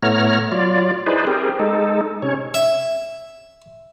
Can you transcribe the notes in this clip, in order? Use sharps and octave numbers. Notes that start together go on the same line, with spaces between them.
A2 A3 B3 C#5 A#5 F6
F#3 F4 D5
D#4 E4 G#4 B4 C5 D5
C4 G4 G#4 A#4
G#3 D#4 A4
C3 C#4 C#5
E5